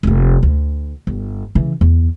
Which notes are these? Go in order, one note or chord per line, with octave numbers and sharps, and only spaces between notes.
F1 A#3
D2
G1
C#3 E3
E2